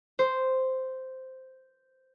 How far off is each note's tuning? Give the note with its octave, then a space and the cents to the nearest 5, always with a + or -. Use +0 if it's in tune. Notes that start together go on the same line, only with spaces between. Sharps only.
C5 -5